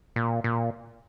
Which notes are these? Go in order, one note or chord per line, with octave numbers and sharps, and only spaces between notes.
A#2
A#2